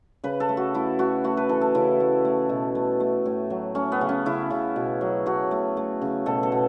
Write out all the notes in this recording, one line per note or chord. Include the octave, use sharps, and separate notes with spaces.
C#3 B4
A4
A3
F#4
A3 E4
A3 F#4
A3 F#4
B4
E3 A4
A4
C#3 E4
A3
A3
B2
A3
A3
A2
F#3
A3 C#4
B3
C#3
C#4
C#3 E4
C#3
B2
F#3
A3 F#4
A3
A3
C#3
B2 A4
A4
B2